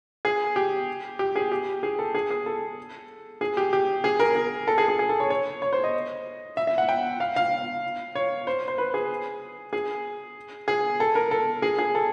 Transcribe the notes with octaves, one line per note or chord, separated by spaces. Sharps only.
G#4
G4
G4
G#4
G4
G#4
A4
G#4
G#4
A4
G#4
G4
G4
G#4
A#4
G#4
A4
G#4
G#4
G#4
A4
C#5
C#5
C#5
C5
D#5
E5
E5
F#5
G5
F5
F5
C#5
C5
C5
B4
G#4
G#4
G#4
A4
A#4
A4
G#4
G#4
A4